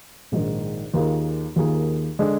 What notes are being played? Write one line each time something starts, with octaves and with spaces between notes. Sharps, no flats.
A#1 G#2 D#3
D#2 D#3 A#3 F4 G#4
D#2 D#3 A#3 F4 G#4
D3 G#3 D4 G#4